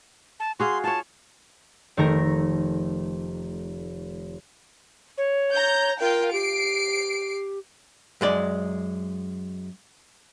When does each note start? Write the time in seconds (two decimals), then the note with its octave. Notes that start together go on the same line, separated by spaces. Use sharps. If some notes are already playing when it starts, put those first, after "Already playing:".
0.40 A5
0.60 F#4 G#4 F5 C6
0.84 F4 C#5 A5
1.97 F1 D#3 A3 A#4 A#6
5.18 C#5
5.51 A#5 G6
6.00 F4 A#4 G5
6.33 G4 C7 D7
8.21 F#2 G#3 D5